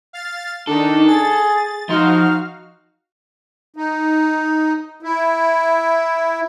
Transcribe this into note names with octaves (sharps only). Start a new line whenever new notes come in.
F5 A6
D#3 D4 D#4 A4
G#4 A6
F3 D#4 F#4 F5 C6 F6
D#4
E4